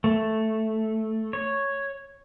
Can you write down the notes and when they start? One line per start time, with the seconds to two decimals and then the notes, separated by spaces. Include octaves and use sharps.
0.04 A3
1.33 C#5